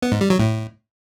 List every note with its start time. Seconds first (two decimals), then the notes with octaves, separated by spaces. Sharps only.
0.02 B3
0.12 G#2
0.21 G3
0.30 F#3
0.39 A2